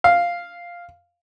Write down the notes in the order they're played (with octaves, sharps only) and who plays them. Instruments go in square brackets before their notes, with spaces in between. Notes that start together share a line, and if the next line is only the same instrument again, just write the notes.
[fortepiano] F5